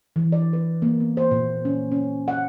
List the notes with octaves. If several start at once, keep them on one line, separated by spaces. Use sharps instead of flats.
E3
D5
B4
A#3
B3
C5
A#2
C#4
C#4
F#5